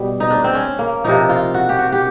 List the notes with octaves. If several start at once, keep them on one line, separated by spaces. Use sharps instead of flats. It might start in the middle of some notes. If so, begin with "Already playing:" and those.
Already playing: B2 G3
D#4
D4
C4
C#4
A#3
C3 F3 D#4
F4
F#4
G4
F#4
G4